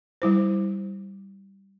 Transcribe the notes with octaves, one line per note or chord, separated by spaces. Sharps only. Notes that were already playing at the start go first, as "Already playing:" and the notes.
G3 E4 C5